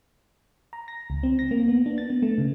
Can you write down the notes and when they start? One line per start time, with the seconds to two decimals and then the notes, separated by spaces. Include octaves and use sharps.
0.73 A#5
0.88 A#6
1.10 C#2
1.23 C4
1.39 A#6
1.51 A#3
1.68 B3
1.86 D4
1.98 A6
2.10 B3
2.22 A3
2.38 C#3